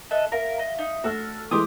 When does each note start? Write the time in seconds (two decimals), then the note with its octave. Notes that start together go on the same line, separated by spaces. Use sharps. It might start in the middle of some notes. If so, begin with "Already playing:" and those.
0.11 A4 D#5 E5 F#6
0.32 A#4 E5 F5
0.59 D#5
0.78 D#4
1.04 A3 D4 F#4 E6 F6
1.51 E3 G#3 A3 G4 C6 D6 D#6